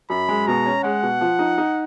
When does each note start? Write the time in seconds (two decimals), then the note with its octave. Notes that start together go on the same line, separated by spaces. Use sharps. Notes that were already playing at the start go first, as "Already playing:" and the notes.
0.10 F#2 B5
0.28 G#3
0.47 B2 A#5
0.66 C#4
0.84 G#3 F#5
1.03 B2
1.21 F3
1.39 D#4
1.58 D#4